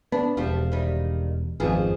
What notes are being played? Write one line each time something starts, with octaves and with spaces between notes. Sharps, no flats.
B3 D4
E1 F3 G3 C4
D#3 G3
G#1 F2 F3 B3 G#4